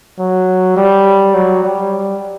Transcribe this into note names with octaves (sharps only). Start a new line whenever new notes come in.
F#3
G3
F#3
G3